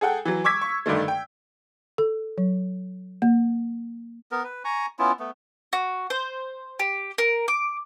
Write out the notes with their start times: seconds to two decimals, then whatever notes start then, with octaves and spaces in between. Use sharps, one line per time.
0.01 G#4 A4 F#5 G5
0.25 E3 F#3
0.44 C#6 D6 E6 G#6 B6
0.61 C#6
0.86 G2 D3 D#3 A3
1.08 G5
1.98 A4
2.38 F#3
3.22 A#3
4.32 B3 A#4
4.44 B4
4.65 G#5 A#5 C#6
4.99 B3 C#4 E4 F4
5.19 A3 B3
5.73 F#4
6.10 C5
6.79 G4
7.18 A#4
7.48 D6